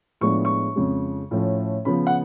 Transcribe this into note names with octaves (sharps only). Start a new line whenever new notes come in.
A2 F3 G#3 B3 D4 C#6
C#6
F2 C#3 G#3
A2 F3 A3 C#4
C#3 F3 B3 B5
F#5